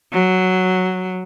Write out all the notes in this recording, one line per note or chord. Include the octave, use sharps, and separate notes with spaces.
F#3